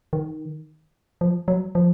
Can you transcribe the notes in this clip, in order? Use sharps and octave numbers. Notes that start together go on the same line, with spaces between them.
D#3
F3
F#3
F3